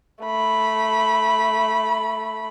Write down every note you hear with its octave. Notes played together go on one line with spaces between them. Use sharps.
A3 B5